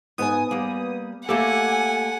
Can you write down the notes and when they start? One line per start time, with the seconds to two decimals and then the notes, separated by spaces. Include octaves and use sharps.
0.18 G#2 B3 B4 G#5 D#6
0.51 G3 A#3
1.29 A3 A#3 G4 A4 F#5 G#5